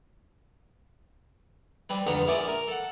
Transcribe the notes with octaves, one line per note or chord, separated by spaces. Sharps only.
G3 C4 B4
F2 G#2 D3 B3 A#5
A#1 C#4 E4 D5 D#6
A#4
A4 F#5